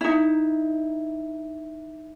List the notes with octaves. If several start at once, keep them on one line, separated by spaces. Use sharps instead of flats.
D#4 E4